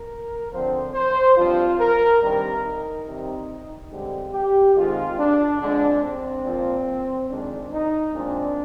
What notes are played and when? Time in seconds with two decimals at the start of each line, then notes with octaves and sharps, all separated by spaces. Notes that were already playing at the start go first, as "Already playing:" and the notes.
Already playing: A#4
0.52 D3 F3 C4 C5
0.94 C5
1.36 G2 F3 C4 F4
1.79 A#4
2.21 G2 D#3 G3 C4 A#4
2.64 D#4
3.06 C3 D#3 G3 C4
3.91 G2 D3 G#3 C4 G4
4.33 G4
4.75 G#2 D#3 G#3 C4 F4
5.18 D4
5.60 F2 D3 G#3 D4
6.02 C4
6.44 A#2 F3 A#3
7.29 F2 D#3 G#3 C4 D4
7.71 D#4
8.14 A#2 G#3 C4 D4